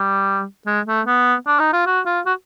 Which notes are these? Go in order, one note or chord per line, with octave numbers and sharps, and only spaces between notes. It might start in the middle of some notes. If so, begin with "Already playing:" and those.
Already playing: G3
G#3
A3
B3
D4
D#4
F4
F#4
F4
F#4